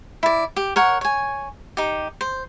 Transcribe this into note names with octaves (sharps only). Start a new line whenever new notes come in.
E4 D5
G4
A#4 C#5 F#5
C#5 G#5
D#4 G4
C5